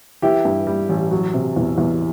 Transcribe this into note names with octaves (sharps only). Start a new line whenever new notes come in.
E3 E4 G4
G2
G3
A1
F#3
C3
E2
E2